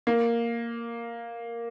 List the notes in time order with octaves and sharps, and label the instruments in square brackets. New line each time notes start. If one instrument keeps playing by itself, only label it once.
[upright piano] A#3